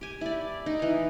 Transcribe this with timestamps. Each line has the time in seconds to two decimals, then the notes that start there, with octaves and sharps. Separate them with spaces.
0.01 G4 G#5
0.21 E4 D5
0.66 D#4
0.79 E3 F5